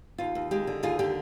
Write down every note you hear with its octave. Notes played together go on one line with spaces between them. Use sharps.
D#2 F4
D#2
G#3 G4
D3
D#2 F4 G#4
D3 G4